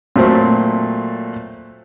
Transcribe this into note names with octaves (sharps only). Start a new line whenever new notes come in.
A#2 F#3 A3 C4